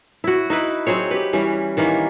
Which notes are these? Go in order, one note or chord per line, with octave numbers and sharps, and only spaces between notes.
E4 F#4
D#4 E4 B4
F#3 C4 G#4 C#5
G4 B4
E3 G3 C#4
D#3 E3 A#3